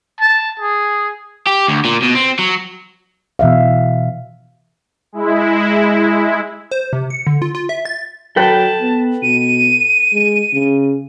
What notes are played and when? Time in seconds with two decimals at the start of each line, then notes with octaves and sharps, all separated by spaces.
0.20 A5
0.60 G#4
1.47 G4
1.68 D2
1.85 A#2
2.02 B2
2.15 C4
2.39 F#3
3.39 B2 E3 E5 F5
5.12 G#3 E4
6.71 C5
6.93 C3
7.10 C#7
7.27 D3
7.42 F4
7.55 F4
7.69 E5
7.85 A6
8.36 F#3 A4 B4 G5 A5
8.81 B3
9.23 B2 D#7
10.13 G#3
10.53 C#3